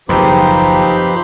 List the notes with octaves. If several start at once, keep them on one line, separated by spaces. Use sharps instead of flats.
F#1 D#2 F3 C4 D#4 G4 B4 C5